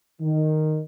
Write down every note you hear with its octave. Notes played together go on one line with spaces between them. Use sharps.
D#3